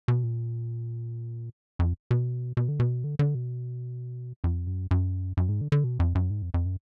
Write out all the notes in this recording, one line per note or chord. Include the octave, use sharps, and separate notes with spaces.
B2
A#2
F2
B2
B2
D3
B2
D3
D3
B2
F2
F#2
F#2
F#2
G#2
D3
D3
B2
F2
F#2
G#2
F2
F2
F#2